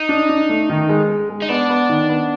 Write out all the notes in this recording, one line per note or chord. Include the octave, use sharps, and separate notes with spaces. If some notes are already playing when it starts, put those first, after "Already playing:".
Already playing: D#4
D4
D4
A3
D#3
G#3
G#3
G#3
D#4
B3 D4
B3
D#3
B3